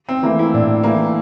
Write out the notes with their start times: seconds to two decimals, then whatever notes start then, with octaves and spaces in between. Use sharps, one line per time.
0.09 C4
0.23 E3 A3 A#3
0.39 E4
0.53 A2 D4
0.83 E3 A3 A#3